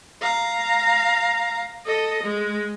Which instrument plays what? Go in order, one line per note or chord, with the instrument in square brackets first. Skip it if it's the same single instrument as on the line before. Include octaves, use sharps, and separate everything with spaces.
[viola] F5 A#5
A4 D#5
G#3